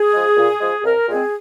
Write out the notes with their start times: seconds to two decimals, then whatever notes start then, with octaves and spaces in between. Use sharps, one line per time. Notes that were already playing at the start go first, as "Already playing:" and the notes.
Already playing: G#4
0.13 F3 G#3
0.37 A#2
0.61 F3 G#3
0.84 C2 A#4
1.08 A#2 G#3 C4 G#4